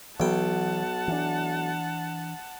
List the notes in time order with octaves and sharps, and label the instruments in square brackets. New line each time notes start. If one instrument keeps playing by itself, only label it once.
[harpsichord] B1 G5 [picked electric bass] E3 F#3 [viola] F#5 A5
[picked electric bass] E3 D4